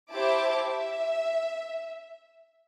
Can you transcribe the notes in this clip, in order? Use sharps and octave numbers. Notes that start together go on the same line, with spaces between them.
E4 G4 C5 E5 A5 D6
E5